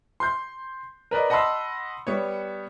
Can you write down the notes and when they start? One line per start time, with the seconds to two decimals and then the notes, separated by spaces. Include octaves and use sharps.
0.20 C6 G6
1.11 A#4 B4 D5 D#5
1.30 D#5 F#5 A5 B5 C6 E6
2.07 G3 B3 C#5